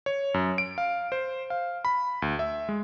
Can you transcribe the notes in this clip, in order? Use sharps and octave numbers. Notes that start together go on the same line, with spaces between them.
C#5
F#2
D7
F5
C5
F5
B5
D2
E5
G#3